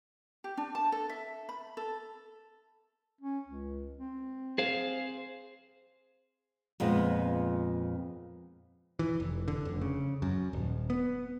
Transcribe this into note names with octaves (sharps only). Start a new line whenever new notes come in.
G4
D4
A5
A4
E5
B5
A4
C#4
C#2
C4
G#4 C5 F5
F2 A#2 G#3 B3
E3
F1
D3
F1
C#3
F#2
D#1
B3